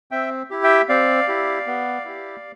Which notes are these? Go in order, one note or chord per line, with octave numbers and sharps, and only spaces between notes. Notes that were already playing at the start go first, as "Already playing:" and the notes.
C4 E5 G5
E4 G4
E5 G5
C4 D5 F5
E4 G4
B3
E4 G4